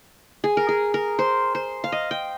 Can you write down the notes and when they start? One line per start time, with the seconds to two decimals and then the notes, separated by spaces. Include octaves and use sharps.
0.44 G#4
0.57 A#4
0.69 G#4
0.94 A#4
1.19 C5
1.55 C5
1.84 F5
1.92 D#5
2.11 G5